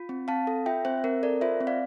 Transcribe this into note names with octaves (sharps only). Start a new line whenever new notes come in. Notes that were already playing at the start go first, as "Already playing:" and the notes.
Already playing: F4
C4
C4 F5 A5
A4
F4 E5 G5
C4 C5 E5
C4 A#4
A4 A#4 D5
F4 C5 E5
C4
D5 F5